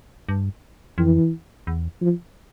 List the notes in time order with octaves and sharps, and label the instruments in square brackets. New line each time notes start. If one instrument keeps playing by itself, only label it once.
[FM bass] G2
[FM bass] F2 [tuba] E3
[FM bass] E2
[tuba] F3